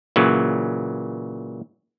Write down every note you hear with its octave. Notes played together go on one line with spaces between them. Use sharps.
A#2 C#3 E3 F#3